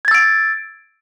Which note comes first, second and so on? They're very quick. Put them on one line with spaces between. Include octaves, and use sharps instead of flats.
G#6 A6 E6 D7